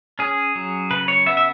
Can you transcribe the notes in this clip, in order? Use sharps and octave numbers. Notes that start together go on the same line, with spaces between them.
C#4 G#4
F#3
C#3 B4
C#5
B3 E5
E5